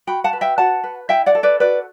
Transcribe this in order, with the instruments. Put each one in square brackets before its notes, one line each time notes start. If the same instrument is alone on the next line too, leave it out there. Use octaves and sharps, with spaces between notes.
[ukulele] F#4 G5 B5
F#5 A5
B4
E5 G5
F#4 F#5 A5
B4
E4 E5 G5
D5 F#5
A4
B4 D5
F#4 B4 D5